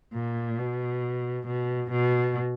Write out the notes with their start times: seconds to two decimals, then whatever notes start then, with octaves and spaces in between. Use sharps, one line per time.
0.14 A#2
0.59 B2
1.47 B2
1.91 B2